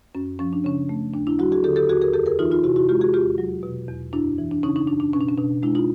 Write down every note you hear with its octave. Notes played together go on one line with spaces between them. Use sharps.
F#2 C#4
F3 C#4
D4
C#3 C#4
A3
D#2 D4
D4 E4
F#3 E4 F#4
F#4 G#4
D3 G4 A4
G4 A4
D#2 F#4 G#4
G#4 A#4
F2 G4 A4
G#4 A#4
E3 D#4 F4
D#4 F4
C3 E4 F#4
E4 F#4
G#3 F4 G4
F#4 G#4
E2 F4 G4
F#3
B2
E2
F#2 D4 E4
E3
D4
C#3 C#4 D#4
C#4 D#4
F#2 D4
D4
B2 C#4
D4
C#4
B2 D4
G#3 D4 E4
D#4 F4